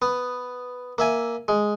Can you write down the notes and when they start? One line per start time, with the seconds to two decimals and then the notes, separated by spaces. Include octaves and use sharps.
0.02 B3
0.98 A#3 E5 G#5
1.48 G#3